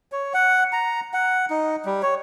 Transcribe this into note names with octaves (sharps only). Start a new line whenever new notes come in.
C#5
F#5
A#5
F#5
D#4
G3
C#5